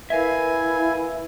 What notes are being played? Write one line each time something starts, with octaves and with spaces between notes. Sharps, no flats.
E4 A#4 B4 E5 F5 G#5